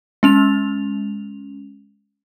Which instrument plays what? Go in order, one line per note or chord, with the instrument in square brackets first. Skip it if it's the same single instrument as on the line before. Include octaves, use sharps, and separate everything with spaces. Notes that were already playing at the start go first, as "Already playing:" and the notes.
[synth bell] G#3 C#4 F7